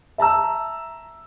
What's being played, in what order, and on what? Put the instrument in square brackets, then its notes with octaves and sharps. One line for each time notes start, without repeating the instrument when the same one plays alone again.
[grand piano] E5 A5 A#5 E6